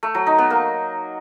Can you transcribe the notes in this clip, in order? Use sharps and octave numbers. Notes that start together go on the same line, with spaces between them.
A3
F#3
D#4
B3
A#3